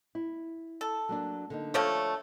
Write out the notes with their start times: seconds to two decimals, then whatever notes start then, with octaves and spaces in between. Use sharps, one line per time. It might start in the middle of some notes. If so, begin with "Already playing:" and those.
0.15 E4
0.81 A4
1.09 F#3 A#3 D4
1.50 D3 A#3 D#4
1.74 D3 F3 A3 C#5